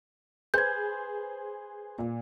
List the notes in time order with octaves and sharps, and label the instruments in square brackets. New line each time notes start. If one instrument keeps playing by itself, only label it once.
[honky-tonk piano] G#4 B4 C5 [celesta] G6 G#6
[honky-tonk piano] A#2